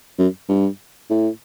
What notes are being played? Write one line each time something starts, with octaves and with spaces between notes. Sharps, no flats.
F#2
G2
A2